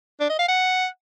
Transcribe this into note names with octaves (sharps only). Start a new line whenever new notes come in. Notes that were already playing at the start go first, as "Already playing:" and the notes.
D4
D#5
F5
F#5